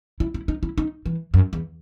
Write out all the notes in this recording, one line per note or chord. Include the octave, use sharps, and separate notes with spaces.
E4
E4
D#4
E4
D#4
E3
F#2
E2